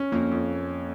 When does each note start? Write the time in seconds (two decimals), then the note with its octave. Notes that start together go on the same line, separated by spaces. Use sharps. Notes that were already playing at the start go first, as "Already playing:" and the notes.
Already playing: C#4
0.12 F2 A#3
0.31 F2